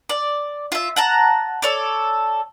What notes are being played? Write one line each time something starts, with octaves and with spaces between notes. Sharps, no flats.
D5
F4 E5
F#5 A5 A#5
A4 C#5 D5